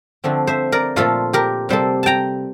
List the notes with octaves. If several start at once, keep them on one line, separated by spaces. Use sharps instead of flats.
D3 F3 A3 C4
C5 E5
A#4 D5
A#2 F3 A3 F4 A4
G4 A#4
C3 G3 A#3 A4 C5
G5 A5 A#5